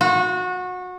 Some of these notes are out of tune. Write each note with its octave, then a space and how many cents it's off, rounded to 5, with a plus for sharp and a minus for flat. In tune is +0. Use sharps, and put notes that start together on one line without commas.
F#4 -25